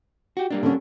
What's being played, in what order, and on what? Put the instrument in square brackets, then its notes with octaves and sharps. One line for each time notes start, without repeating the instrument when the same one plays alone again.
[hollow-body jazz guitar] F#4 G4
G3 A#3 D4
[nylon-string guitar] D3 C#4